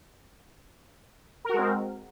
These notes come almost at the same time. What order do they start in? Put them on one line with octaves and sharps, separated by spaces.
A#4 F#4 G#3 C4